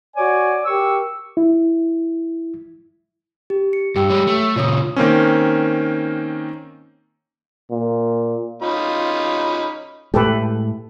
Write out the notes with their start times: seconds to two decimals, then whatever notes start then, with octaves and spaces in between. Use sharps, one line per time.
0.16 F#4 C#5 D5 G#5
0.66 G4 A#4 C#6 E6
1.37 E4
3.50 G4
3.73 C#7
3.96 G2 G4 G5 E6
4.10 G3 G#3 C#5
4.27 A3
4.56 A#2 C#3 F4 C#5 D#6
4.96 D#3 A#3 C4 C#4
7.71 A#2
8.62 C#4 D#4 F4 B5
10.14 A2 G#3 G4 A4 B4